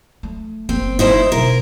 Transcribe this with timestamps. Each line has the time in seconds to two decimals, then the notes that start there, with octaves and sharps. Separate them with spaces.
0.23 A3
0.69 F#1 A#3 C4
0.99 D#4 E4 C5
1.32 B2 D3 A#4